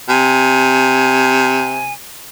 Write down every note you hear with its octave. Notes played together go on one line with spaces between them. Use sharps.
C3 G#5